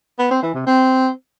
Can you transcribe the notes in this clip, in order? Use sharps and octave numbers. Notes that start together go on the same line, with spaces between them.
B3
C4
E3
C3
C4